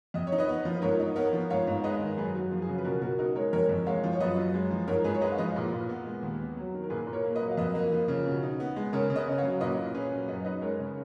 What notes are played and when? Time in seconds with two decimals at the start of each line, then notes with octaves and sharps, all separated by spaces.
0.14 F2 D#5
0.27 C#5
0.32 D#4
0.38 B4 D#5
0.48 B3
0.65 F3
0.76 B4
0.82 G#2 A#4 C#5
1.00 D#4
1.16 B3 A#4 C#5
1.33 F3
1.50 G#2 C#5 F5
1.67 G#2
1.84 G#3 B4 D#5
2.00 D#3
2.17 F#2 G#4 B4
2.35 F#2 F#4
2.51 F3 F4
2.62 G#4
2.68 C#3 F#4
2.78 B4
2.84 B2 F#4 A#4
3.01 B2 F#4 A#4
3.19 D#4 F#4 A#4
3.35 G#3 A#4 C#5
3.53 F2 A#4 C#5
3.69 F2
3.87 G#3 C#5 F5
4.04 F3
4.13 C#5
4.20 F#2 B4 D#5
4.37 F#2
4.54 G#3
4.71 F3
4.88 G#2 A#4 C#5
5.04 G#2 G#4 B4
5.14 C#5
5.21 G#3 B4 D#5
5.32 F5
5.38 F3 B4 D#5
5.56 A#2
5.73 A#2
5.89 B3
6.06 G#3
6.23 D#2
6.40 B3
6.57 F#3
6.74 D#3
6.83 A#4
6.90 A#2 G#4 B4
7.07 A#2
7.13 A#4 C#5
7.24 A#3
7.36 B4 D#5
7.41 F#3
7.51 F5
7.57 F2 B4 D#5
7.75 A#3
7.92 F3
8.08 C#3
8.26 B2
8.43 D#4
8.60 B3
8.76 G#3
8.93 C#3 A#4 C#5
9.10 C#3
9.16 B4 D#5
9.28 C#4
9.38 C#5 F5
9.44 F#3
9.60 A#2 B4 D#5
9.77 A#2
9.95 C#4 G#4 B4
10.11 F#3
10.28 F#2 B4 D#5
10.45 D#4 B4 D#5
10.62 G#3 A#4 C#5
10.79 C#3